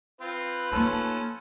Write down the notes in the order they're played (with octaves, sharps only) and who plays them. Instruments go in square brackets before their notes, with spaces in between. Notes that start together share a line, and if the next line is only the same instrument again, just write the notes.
[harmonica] C4 F4 [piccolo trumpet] B4
[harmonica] F3 C#4 A4 [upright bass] A#3 D#4